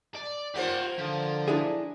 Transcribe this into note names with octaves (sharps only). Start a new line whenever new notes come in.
D5
A#3 F4 G4 C5 F#5
D3 F3
D4 E4 G#4